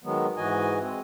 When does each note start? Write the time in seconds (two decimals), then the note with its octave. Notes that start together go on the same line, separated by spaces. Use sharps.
0.04 D#3 F#3 G#3 B3
0.37 G#2 E3 F#4 D#5 G#5
0.80 G#3 C4